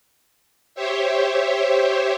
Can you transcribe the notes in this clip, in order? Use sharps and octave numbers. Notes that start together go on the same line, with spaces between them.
G4 C5 C#5 E5